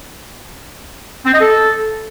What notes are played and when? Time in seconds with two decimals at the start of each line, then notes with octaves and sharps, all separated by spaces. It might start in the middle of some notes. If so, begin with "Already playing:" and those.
1.25 C4
1.33 D#5
1.41 A4